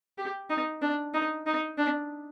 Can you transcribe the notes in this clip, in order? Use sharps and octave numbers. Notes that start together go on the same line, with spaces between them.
G4
D#4
D4
D#4
D#4
D4